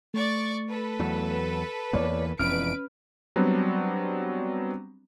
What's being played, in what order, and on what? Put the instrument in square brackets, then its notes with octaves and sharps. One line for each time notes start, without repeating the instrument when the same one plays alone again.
[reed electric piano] A3 [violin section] D5 C#6 A6
[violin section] A4 B4
[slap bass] E2 F#3
[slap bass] E2 E3 A#3 [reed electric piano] C#5 D5
[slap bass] E1 F2 E3 [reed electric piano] C#4 F6 [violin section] B4 D7
[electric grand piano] F#3 G3 B3 C4 D4 F#4